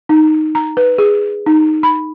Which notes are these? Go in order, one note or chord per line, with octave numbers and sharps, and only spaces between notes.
D#4
A#5
B4
G#4
D#4
B5